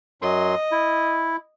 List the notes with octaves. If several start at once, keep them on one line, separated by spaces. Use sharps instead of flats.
F#2 F#3 D#5 C6
E4